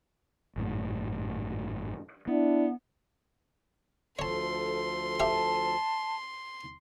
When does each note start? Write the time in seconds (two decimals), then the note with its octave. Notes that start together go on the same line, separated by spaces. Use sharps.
0.56 G#1 F#2 A2
2.27 B3 D4 E4
4.19 D2 F3 A4 C#5 A5 C6
5.20 G4 E5 F5 A5